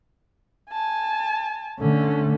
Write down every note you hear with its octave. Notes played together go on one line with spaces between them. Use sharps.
G#5 A5
D3 A3 C#4